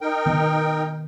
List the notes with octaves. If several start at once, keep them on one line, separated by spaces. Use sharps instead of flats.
D#4 A#4 G5
D#3 B3